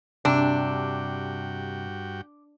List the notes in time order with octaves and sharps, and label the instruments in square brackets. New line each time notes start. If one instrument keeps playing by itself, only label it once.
[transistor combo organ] G2 F#4 G5 [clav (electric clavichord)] C3 [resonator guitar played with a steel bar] D4